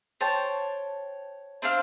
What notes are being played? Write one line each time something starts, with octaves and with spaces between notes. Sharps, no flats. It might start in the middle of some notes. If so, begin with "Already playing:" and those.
C5 C#5 G5 A5
C4 D4 C5 F5